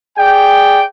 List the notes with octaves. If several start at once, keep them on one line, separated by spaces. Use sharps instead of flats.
G#4 D5 G5